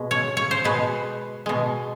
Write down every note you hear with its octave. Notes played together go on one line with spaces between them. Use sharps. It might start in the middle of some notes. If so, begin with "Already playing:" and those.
Already playing: B2 G#3
C#5
C#5
C5
B2 G#3 B4
B2 G#3